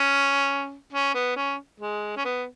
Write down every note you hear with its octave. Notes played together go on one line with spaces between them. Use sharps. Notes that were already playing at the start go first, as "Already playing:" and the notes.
Already playing: C#4
C#4
B3
C#4
G#3
C#4
B3